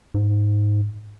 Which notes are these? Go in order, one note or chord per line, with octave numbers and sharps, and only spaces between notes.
G#2